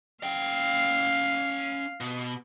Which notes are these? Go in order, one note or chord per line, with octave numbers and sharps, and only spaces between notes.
C#4 F5 G5
B2